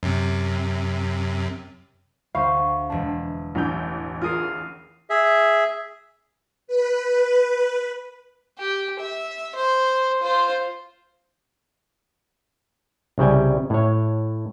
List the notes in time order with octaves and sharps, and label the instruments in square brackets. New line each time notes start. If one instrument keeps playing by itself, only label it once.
[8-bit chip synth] F#2 C3
[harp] D2 [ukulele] C5 F5 [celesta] B5 C#6
[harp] E1 D4 [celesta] A5
[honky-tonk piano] A1 E3 G6
[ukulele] F4 G#4 A#4 [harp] F5 D#6 C7
[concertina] G#4 E5
[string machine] B4
[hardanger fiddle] G4
E5
C5
F4 C5
[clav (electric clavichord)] C2 C#3 G3 G5 G#5
A2 C#5